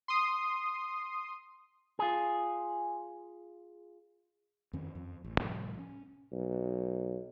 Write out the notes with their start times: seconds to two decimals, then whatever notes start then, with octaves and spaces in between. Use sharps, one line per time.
0.08 C6 D#6
1.99 F4 G#4
4.73 F2 D#3 C#4
4.95 F2
5.24 A1
5.40 A2 C3 F3 G3
5.79 C#4
6.32 B1